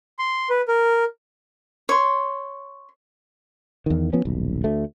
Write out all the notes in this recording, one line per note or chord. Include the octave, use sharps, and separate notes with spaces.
C6
B4
A#4
C#5 C6
E2 D#3
F3 B3 C#4
D#1 B1
D2 A3